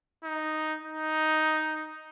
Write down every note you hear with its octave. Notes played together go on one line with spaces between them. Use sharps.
D#4
D#4